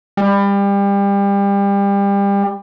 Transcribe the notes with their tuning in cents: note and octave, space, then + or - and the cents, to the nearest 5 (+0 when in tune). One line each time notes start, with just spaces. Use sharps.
G3 +30